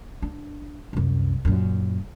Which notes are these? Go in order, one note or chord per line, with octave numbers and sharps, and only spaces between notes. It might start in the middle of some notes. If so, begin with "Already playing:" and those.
D4
C2 F#2
F#2 A#2